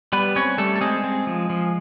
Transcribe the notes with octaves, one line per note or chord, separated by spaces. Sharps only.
G3 B3 B4
C4 C#4 C#5
G3 A3 A4
A4
G#3 C4 G#4
C4
F3
F3